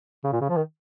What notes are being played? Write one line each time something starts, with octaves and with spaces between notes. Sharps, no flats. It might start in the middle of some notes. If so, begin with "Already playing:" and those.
C#3
A#2
C#3
F3
D#3